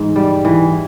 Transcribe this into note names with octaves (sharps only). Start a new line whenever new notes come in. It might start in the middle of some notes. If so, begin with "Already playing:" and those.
Already playing: G#2 E3
G3
E3